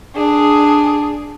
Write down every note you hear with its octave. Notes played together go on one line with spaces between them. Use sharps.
D4 G#4